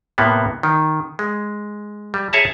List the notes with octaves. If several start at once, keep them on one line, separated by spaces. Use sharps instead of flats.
A2 C3 A#3 B3
D#3
G#3
G3
G#4 C#5 E5 A5 A#5